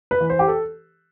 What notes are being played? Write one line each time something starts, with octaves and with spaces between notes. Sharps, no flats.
B4
E3
C5
G4
A4